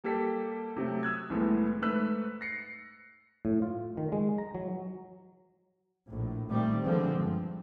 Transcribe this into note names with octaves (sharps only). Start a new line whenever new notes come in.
G3 A#3 G4 A4 B6
C3 F#3 A3 G4
D#6 E6 F#6 G#6
C2 A2 E3 G#3 A3 B3
G#2 A3 B4 E6 F#6 B6
A#6 C7 C#7
A2
F4
D#3
G#3
A#5
F#3
A#1 A2
A#2 D#3 G3 A3 C4
D3 F3 G#3 B3 C4
G2